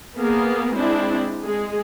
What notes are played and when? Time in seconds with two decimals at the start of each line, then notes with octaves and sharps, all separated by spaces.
0.18 A#3 B3 G#4 A#4
0.76 G#3 C4 D4 E4
1.43 G#3 G#4